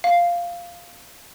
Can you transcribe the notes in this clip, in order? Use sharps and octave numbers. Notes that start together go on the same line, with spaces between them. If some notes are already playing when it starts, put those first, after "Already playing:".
F5